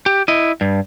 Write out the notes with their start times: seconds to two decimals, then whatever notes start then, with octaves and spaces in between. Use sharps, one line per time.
0.06 G4
0.28 E4 D#5
0.61 G2